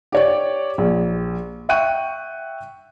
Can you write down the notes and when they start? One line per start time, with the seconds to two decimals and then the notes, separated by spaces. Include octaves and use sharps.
0.12 G4 C#5 D5
0.78 A#1
1.69 E5 F#5 G5 C#6 F#6 D#7